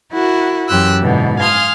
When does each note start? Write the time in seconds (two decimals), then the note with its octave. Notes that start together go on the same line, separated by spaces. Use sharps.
0.13 E4 F#4 A#4 F#5
0.69 F#2 E3 G4 C6 E6 F#6
1.00 G#2 B2 D3 E3
1.39 F5 G#5 C6 D#6 F6